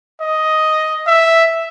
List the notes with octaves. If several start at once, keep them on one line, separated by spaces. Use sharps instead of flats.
D#5
E5